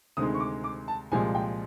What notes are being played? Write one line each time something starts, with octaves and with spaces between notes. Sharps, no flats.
D2 C3 D#3 G#3 D#6
C#6
D6
D6
A5
C2 A#2 F3 G#3 G#5
G5